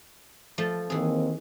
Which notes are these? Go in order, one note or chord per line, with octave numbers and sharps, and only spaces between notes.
F3 A3
D#2 D#3 E3 C4 G#4